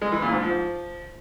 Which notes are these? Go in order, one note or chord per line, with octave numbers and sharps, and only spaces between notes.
G#3
E3
A#2
G#2
F3